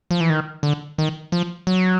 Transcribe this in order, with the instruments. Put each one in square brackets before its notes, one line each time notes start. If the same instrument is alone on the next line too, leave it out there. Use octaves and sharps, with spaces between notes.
[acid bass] F3
E3
D#3
D3
D#3
F3
F#3